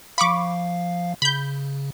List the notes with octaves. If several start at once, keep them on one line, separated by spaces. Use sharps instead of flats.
F3 F5 B5 C#6 D6
C#3 B5 G6